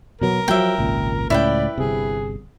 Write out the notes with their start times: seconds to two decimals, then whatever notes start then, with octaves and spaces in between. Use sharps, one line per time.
0.21 B2 F#3 B3 A#4
0.48 F3 F#3 A#3 E5 G5
0.78 G#1 C#2 A#2
1.30 C#2 A2 C#4 E4 B4 D5 G5
1.78 G1 C3 G#4